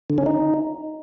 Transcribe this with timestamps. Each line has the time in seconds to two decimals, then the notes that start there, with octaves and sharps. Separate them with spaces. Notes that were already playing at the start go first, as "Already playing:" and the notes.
0.10 D3
0.18 C#4
0.26 D#4